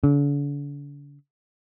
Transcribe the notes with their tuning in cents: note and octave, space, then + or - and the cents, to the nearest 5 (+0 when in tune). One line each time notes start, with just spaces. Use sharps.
D3 -40